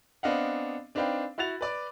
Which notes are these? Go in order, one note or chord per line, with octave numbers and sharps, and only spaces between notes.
B3 C4 D4 D#5 F5 F#5
C4 D4 D#4 B4 F5 G5
E4 F#4 F#5 A6 F7
B4 D5 D6